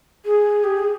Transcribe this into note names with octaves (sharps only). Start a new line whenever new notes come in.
G#4
G4
G#4